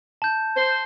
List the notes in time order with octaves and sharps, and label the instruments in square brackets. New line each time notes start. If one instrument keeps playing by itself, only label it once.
[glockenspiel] A5 G6
[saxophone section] C5